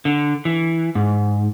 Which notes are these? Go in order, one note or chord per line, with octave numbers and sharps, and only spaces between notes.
D3
E3
G#2